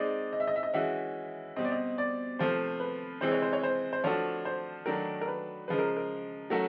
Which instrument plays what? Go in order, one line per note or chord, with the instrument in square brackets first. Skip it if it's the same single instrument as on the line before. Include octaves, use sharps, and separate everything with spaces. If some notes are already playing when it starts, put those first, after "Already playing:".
Already playing: [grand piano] G#3 C4 D#4 [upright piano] D5
[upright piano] D#5
E5
D#5
E5
D#5
[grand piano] E3 G#3 C#4 F#4 [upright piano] E5
[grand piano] B2 G3 C4 [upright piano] D#5
[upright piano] D5
D#5
D5
[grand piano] C3 F3 A3 [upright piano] C5
[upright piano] B4
[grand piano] C3 E3 G#3 C4 [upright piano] C5
[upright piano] C#5
C5
C#5
C5
C5
[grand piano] F3 A3 D4 F#4 A4 [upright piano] C#5
[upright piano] C5
[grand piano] D#3 F#3 A3 D4 [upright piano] A#4
[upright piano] A#4
B4
[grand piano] C#3 F3 G#3 [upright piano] B4
[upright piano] A#4
A#4
[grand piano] F#3 A3 C#4 F#4 [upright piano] A#4